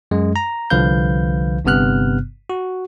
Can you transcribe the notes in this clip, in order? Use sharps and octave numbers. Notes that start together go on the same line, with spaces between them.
F#2 G#3
A#5
C2 D3 F3 B4 F5 G6
G1 G2 C3 B3 F6 F#6
F#4